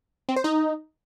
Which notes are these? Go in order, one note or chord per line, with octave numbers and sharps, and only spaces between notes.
C4
C5
D#4